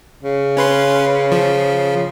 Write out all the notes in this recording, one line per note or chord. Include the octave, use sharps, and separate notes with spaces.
C#3
C#4 B4 C6
F3